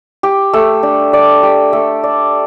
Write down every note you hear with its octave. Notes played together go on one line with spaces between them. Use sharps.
G4
A3
D4
D5
G4
A3
D5